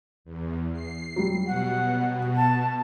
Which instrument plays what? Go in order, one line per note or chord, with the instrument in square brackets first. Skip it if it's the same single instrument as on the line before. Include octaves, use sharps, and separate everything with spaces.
[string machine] E2
C7
[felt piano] F#3 G3
[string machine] B2 [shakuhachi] F#5
[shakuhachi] A5